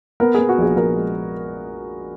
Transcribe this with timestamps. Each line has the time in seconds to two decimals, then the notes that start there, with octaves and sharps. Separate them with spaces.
0.20 B3 A#4
0.34 B3 G#4
0.49 F#4
0.58 A#1 G#4
0.76 A#1 A#4
0.96 G#3